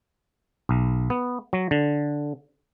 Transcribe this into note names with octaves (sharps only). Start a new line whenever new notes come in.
B1
B3
F#3
D3